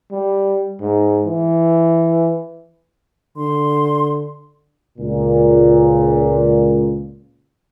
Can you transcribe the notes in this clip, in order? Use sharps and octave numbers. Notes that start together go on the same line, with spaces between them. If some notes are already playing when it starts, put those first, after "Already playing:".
G3
G#2
E3
D3 C6
C#2 A#2